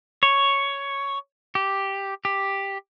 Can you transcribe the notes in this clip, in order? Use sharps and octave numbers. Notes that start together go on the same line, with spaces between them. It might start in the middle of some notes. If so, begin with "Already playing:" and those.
C#5
G4
G4